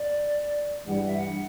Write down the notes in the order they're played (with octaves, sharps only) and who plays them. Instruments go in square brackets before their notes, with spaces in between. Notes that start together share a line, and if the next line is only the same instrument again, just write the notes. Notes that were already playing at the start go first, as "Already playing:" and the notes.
Already playing: [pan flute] D5
[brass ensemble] G2 E3 G3 [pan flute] F#5
[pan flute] E5
F#5